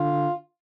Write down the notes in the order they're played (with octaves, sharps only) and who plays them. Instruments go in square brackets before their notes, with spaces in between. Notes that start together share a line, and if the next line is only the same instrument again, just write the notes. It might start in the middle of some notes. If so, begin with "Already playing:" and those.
Already playing: [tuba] D3 [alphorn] F4